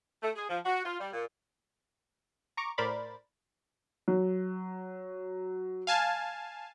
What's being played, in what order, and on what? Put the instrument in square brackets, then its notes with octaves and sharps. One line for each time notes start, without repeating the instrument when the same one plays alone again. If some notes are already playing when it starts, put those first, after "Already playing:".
[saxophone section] A3
G#4
F3
F#4
F4
G3
A#2
[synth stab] A#5 C#6 D6
A2 A#4 C5 D5 B5 A6
[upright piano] F#3
[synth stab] F5 G#5 A5